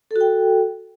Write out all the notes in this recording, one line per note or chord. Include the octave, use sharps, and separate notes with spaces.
F#4 A4 G5